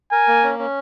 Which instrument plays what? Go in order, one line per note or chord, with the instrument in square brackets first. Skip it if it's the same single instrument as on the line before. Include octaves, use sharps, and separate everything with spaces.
[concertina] A#4 [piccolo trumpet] G#5
[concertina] A#3
C#4
C#4